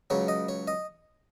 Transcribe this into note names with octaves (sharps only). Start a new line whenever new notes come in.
C#2 C#3 F#3 C#5
D#5
C#5
D#5